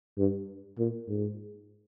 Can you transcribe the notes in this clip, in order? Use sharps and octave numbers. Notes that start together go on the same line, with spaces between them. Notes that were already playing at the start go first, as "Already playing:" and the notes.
G2
A#2
G#2